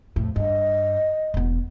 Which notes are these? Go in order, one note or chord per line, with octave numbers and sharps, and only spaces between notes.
F2 A2
G2 D#5
E1 B3